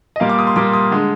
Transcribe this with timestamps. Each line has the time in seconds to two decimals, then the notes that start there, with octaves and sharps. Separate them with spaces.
0.16 D#5
0.20 A#2 G3 A#3 F5
0.29 D6
0.39 D#6
0.47 C6
0.56 A#2 G3 A#3 D6
0.73 D#6
0.91 D3 G#3